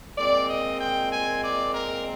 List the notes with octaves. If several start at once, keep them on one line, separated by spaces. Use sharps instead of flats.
A#2 G#3 C4 D5
D#5
G5
G#5
D5
A#4